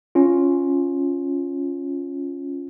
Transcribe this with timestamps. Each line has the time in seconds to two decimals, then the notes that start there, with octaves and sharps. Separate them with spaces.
0.15 C#4 F4